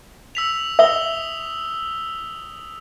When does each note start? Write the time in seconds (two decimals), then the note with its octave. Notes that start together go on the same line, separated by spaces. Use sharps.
0.35 E6 B6 F7
0.79 E5 D#6 E6 G7